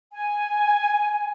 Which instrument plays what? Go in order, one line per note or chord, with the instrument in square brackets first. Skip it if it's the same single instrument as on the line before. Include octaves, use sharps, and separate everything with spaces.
[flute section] G#5